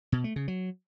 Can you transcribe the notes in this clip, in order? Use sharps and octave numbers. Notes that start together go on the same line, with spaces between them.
B2
A3
C#3
F#3